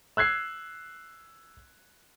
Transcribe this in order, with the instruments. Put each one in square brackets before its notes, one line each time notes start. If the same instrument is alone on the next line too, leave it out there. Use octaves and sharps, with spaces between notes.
[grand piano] E6 F#6 G#6 C7